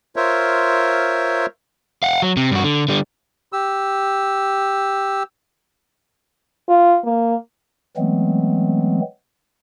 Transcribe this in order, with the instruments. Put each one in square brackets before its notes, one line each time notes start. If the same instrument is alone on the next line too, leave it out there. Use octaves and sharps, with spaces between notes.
[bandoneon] F4 A#4 C5 C#5 E5
[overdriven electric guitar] F5 F#5
F#3
C3
G2 F#4
D3
D3 G3
[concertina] G4 E6
[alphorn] F4
A#3
[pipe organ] E3 F#3 G#3 A3 B3 C4